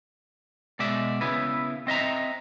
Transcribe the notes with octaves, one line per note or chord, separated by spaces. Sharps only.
B2 G#3 D5 E5
C#3 B3 E4 B4
C4 D#5 E5 A#5